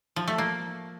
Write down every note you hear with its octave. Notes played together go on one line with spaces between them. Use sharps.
F3
A3
A#3